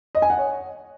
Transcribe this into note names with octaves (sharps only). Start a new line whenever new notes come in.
D#5
G#5
F#5
C#5